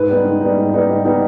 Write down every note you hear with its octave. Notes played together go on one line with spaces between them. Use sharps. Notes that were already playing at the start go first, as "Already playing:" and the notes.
Already playing: G#2 B4
G3 B3 D#4
G#2
G3 B3 D#4
G#2
G3 B3 D#4
G#2
G3 B3 D#4